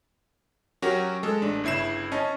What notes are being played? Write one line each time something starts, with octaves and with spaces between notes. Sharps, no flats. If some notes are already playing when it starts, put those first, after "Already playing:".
F#3 C#4 F#4 G4 A#4
G#3 A4
A1 D4
G1 C#3 E4 C7 E7
C#4 D#5 A5